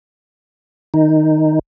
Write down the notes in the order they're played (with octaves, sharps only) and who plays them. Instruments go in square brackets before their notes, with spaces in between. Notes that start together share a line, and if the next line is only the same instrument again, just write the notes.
[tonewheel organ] D#3 D#4